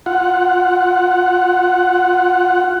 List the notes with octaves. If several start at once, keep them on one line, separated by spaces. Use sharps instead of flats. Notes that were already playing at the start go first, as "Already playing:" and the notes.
F4 F#5